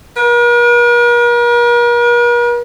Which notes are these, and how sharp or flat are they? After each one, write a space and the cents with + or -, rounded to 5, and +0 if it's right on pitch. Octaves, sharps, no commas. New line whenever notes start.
A#4 +45